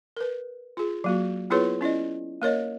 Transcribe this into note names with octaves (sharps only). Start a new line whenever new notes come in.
A#4 B4
F4 G#4
F#3 A#3 F#4
B3 E4 F4 G#4 B4 C#5
C#4 E4 D5 D#5
A#3 A#4 C#5 D#5